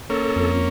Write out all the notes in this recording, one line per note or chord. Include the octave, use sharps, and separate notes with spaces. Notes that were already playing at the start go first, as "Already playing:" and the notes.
A#3 C#4 A4
F2